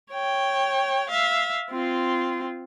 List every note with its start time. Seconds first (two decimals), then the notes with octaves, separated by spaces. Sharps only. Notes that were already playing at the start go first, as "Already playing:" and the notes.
0.12 C#5 G5
1.09 E5 F5
1.70 C4 F4